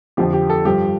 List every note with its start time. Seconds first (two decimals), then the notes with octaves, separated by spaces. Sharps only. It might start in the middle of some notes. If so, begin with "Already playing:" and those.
0.17 F2 D3 F3 G4
0.33 G4
0.50 A4
0.65 G2 F3 G4